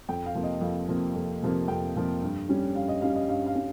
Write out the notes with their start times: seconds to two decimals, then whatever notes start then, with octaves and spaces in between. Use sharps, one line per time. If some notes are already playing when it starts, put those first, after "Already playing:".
0.09 F2 G5
0.26 F5
0.35 C3 F3 A#3
0.43 D#5
0.61 F2 F5
0.88 C3 F3 A#3
1.15 F2
1.42 C3 F3 A#3
1.68 F2 G5
1.95 C3 F3 A#3
2.22 G2
2.49 G3 C#4
2.75 G2 F5
2.88 D#5
3.02 G3 C#4 F5
3.16 D#5
3.29 G2 F5
3.46 F5
3.55 C#4